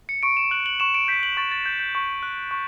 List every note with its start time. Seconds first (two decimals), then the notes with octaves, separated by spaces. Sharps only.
0.09 C#7
0.23 C#6 D7
0.37 E7
0.51 F#6 F#7
0.66 F#7
0.80 C#6 E7
0.94 D7
1.08 G6 B6
1.23 F#7
1.37 C#6 A6
1.51 A6
1.66 G6
1.80 G6
1.95 C#6
2.23 F#6
2.51 C#6